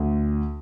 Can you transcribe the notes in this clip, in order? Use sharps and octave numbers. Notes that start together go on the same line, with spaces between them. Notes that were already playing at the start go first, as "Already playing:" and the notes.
Already playing: D2